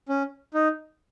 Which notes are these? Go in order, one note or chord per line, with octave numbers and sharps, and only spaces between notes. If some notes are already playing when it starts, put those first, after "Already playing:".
C#4
D#4